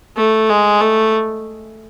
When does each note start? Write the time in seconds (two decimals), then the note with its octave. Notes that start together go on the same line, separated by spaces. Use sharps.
0.17 A3
0.49 G#3
0.81 A3